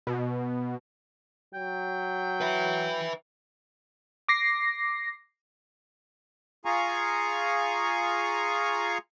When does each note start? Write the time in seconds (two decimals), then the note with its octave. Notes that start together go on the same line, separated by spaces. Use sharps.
0.07 B2
1.54 F#3 G5
2.41 B4 E5
4.29 D6 A#6 C7
6.65 F4 G#4 F5 G#5 A#5 C#6